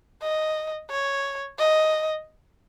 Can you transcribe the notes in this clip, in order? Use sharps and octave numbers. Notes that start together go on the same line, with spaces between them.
D#5
C#5
D#5